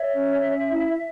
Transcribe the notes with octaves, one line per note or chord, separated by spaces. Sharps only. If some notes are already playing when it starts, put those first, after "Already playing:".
Already playing: C#5 E5
C#4
C#4
E4